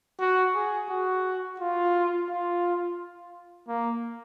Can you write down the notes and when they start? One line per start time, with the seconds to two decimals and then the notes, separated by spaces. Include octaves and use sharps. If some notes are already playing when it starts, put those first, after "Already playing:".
0.20 F#4
0.55 G#4
0.89 F#4
1.60 F4
2.29 F4
3.68 A#3